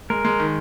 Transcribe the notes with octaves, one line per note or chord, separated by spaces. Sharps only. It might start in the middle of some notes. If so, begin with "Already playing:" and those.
G#3 A#4
G#3
D#3